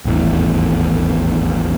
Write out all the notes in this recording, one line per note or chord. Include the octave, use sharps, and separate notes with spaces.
D#1 G#1 E2 A2